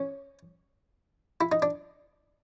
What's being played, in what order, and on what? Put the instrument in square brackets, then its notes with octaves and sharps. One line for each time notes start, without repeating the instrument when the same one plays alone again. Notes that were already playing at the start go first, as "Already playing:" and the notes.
Already playing: [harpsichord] C#4
E4
D#4
D4